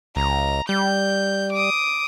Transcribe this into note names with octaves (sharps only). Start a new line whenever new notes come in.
C#2 A#5
G3 G6
D6 D#6